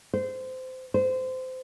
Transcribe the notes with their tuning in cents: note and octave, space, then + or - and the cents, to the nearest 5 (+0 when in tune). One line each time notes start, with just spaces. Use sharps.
C5 -20
C5 -25